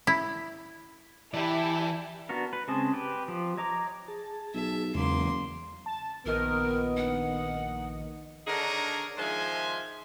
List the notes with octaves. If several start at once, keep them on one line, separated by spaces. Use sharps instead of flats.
E4
E3 E4 G4 D5 A5
B3 D4 F#4 A#4
B4
C#3 G#3 C4 A5 D#6
G4 B4
F3 G4
C#5 D#5 A#5 D6
G#4 A5
B1 E5
F#1 E2 C#3 G#3 A#3 C6
A5
A#1 D#3 B3 A#4 D#5
F#5
D3 D4 D#4 G#4 A#4 C#5
D#3 F3 G#3 C5 E5 G#5